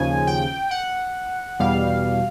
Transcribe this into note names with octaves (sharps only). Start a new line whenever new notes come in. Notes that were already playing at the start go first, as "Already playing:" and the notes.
Already playing: D#2 C#3 F3 G#5
G5
F#5
E2 B2 G3 F5